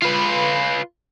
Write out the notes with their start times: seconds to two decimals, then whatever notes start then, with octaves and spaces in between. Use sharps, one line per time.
0.03 F4 B4